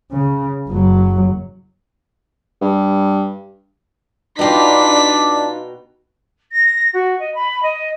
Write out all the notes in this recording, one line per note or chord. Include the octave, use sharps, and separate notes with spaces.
C#3
F#1 F#3
G2
B2 D4 D#4 F4 G5 A#5 B6
A#6
F#4
D#5
B5
D#5